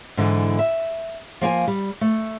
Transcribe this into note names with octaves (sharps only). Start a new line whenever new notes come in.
G#2 D3 E3
E5
F3 A#3 G5 G#5
G3
A3